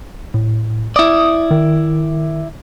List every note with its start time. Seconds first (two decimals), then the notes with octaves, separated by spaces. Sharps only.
0.34 A2
0.96 E4 D5 D#6
1.51 D#3